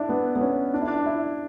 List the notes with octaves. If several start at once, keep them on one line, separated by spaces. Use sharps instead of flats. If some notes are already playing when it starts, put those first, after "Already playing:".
Already playing: D4 E4
B3
B3
C#4
D4
E4
D4
E4